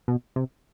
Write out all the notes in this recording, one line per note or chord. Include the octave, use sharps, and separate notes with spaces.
B2
C3